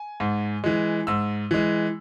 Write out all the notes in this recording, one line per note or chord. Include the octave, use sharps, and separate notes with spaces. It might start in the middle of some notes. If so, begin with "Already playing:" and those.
Already playing: G#5
G#2
E3 G#3
G#2 E6
E3 G#3